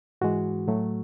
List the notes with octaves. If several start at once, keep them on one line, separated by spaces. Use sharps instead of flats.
G#2 E3 G#3 F#4
A2 F#3 A3